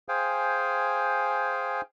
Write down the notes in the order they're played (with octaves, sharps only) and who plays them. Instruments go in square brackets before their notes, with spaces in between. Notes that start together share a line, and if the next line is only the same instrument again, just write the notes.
[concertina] G#4 C5 F5 G5 G#5